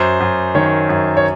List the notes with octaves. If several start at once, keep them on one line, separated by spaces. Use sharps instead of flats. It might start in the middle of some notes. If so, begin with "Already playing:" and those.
Already playing: F#2 C5
F#2
D#3 C#5
F#2
C#5